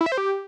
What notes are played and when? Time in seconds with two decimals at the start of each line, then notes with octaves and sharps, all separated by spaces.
0.01 E4
0.06 E5
0.12 C5
0.18 G4